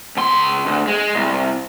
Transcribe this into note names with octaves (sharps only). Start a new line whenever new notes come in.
C#2 C6
D2
G#3
C2